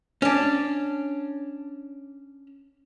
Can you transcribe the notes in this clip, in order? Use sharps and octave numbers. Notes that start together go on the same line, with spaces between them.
C#4 D4